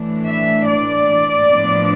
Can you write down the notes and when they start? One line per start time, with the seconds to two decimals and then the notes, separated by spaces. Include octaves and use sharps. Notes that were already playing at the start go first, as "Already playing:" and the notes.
Already playing: A2 E3 A3 D4
0.27 E5
0.67 D5
1.48 A2 F3 B3 D4